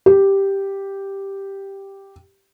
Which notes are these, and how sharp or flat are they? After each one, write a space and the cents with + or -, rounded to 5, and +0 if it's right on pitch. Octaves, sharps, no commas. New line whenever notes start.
G4 +0